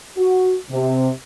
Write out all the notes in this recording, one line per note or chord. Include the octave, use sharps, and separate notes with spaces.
F#4
C3